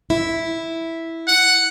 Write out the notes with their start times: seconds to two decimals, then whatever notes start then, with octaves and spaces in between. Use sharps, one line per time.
0.10 E4
1.28 F#5